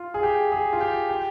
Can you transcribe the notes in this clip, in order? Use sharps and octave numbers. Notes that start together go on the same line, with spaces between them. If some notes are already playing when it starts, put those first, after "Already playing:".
Already playing: F4
G#4
G4
G#4
F4
G4
G4